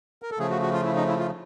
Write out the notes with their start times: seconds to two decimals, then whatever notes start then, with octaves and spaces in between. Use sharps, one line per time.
0.22 A#4
0.31 A4
0.39 C#3 F3 A3 G#4
0.50 F#4
0.62 F#4
0.73 F4
0.84 E4
0.96 D#4
1.07 E4
1.19 F4